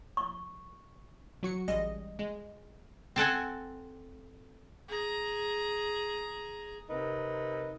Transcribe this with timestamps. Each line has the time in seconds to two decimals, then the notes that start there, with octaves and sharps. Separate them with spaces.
0.17 C#6
1.43 F#3 F#4 C#7
1.68 A1 G3 G#3 D#5
2.19 G#3
3.16 C4 A4 F#5 G#5
4.88 G#4 A#5
6.90 C3 D#4 A#4 B4